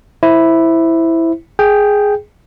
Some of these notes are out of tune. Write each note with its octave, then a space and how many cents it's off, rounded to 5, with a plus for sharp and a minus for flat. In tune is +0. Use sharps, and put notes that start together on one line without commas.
E4 +0 C5 +0
G#4 +0 G5 +0